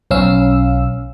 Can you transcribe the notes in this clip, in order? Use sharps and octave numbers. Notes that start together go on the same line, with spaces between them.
B1 C#4 F5 E6